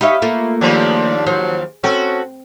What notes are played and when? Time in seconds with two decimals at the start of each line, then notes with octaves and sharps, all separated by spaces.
0.01 D#4 G4 C#5 E5 F5 B5
0.22 A3 A#3 F4
0.61 D#2 F3 G3 D4 G#4
1.27 F#3 C5 F5
1.84 C4 C#4 F#4 A4